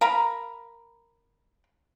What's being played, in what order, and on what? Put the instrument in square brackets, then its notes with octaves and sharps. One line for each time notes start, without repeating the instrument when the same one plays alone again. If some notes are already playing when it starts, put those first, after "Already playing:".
[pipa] A#4 F5 A#5 B5